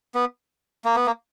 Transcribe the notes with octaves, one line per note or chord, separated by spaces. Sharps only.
B3
A#3
B3
A#3